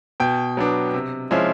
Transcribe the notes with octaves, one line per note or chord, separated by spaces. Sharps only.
B2 G5
F#3 B3 D4
C3
F3 G#3 C#4 E4